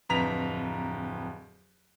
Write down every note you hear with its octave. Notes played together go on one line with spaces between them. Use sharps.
D1 F2 B4 A#5 B6 F7